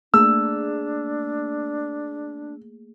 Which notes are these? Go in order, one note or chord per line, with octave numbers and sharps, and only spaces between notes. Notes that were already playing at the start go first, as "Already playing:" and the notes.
A3 A#3 D4 G#4 E6